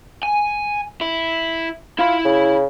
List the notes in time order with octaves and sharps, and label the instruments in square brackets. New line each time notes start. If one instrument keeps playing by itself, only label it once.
[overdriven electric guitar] G#5
E4
[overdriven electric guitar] E4 B5 [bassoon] F4
[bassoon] C#3